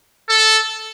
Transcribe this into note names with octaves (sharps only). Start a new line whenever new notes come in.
A4